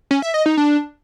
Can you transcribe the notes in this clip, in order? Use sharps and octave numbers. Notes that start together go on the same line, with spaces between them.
C#4
E5
D#5
D#4
D4